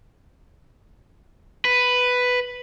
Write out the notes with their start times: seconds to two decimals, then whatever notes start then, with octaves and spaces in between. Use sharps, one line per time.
1.65 B4